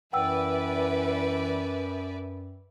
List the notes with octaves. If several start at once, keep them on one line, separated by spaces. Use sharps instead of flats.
F#2 E3 B4 D5 E5 F#5 G5 E6